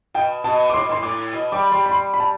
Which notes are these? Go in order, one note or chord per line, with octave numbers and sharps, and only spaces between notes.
B2 G5
B2 A5
D6
A2 C6
B2
A2 C6
A2 D6
B2
G3 D6
G3 C6
B5
C6
B5
A5